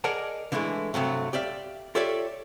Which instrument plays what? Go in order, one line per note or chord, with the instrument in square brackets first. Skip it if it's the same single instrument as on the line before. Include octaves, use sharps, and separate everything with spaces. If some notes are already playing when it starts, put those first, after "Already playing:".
[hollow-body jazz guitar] G#4 A#4 D5 D#5 F#5 A5
D3 E3 G#3 A3 E4
G2 C3 F#3 A3
G4 D5 E5 F5
F4 G4 A4 C#5 D5 E5